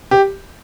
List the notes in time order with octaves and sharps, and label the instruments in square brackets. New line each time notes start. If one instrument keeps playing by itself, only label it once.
[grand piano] G4